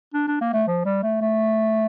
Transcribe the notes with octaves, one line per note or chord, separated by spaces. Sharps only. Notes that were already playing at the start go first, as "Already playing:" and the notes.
D4
D4
A#3
A3
F3
G3
A3
A3